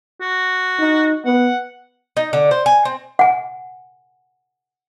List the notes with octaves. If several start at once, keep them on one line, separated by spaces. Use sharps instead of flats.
F#4
D#4
B3 F#5
D#4
D3
C5
G#5
C4
F#5 G#5